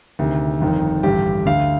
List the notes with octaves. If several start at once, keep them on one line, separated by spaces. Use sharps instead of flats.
D2 C3 D#3
G1 F2 D#3
A1 G2 D3 G4
D2 D3 F5